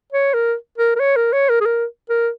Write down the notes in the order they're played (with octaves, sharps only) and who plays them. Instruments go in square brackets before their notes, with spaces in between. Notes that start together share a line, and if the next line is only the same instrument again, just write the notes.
[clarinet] C#5
A#4
A#4
A#4
C#5
A#4
C#5
A#4
G#4
A#4
A#4